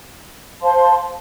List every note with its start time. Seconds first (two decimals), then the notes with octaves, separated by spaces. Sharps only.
0.61 C5 F5 A5 C6